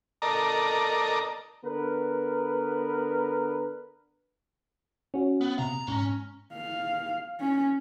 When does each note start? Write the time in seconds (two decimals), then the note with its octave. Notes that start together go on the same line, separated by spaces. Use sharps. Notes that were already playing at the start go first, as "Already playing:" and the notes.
0.22 A4 A#4 D5 D#5 A#5
1.64 D3 B3 A#4 B4
5.14 C#4 F#4
5.41 B3
5.59 C3 A#5
5.88 G#2 C#4 A#5
6.53 F5
7.40 C#4